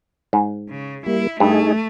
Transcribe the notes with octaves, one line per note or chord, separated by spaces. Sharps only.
G#2
C#3
G3 A#3 E4
G2 A3 D#4 G#4